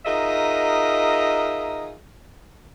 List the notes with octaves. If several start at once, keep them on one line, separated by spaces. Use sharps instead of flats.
D#4 F4 G#4 A#4 D#5 E5